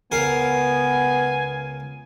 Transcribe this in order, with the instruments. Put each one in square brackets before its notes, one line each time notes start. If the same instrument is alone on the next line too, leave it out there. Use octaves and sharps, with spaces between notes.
[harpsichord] C#2 A#4 F5 [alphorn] B3 [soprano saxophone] G#5